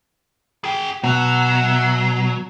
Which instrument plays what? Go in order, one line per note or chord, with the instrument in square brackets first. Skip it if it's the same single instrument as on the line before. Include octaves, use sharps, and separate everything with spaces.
[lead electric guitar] G#4 G5
[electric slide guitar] B2 [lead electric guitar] F#3 [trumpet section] E5 F#5